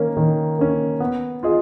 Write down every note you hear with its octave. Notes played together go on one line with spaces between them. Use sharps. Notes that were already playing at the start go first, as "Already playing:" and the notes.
Already playing: D#3 A#3 C#4
D#3
A#3 C#4
B3
F4 G#4 D#5